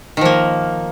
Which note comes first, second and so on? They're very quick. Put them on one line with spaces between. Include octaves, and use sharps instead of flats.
D#3 F3 A#3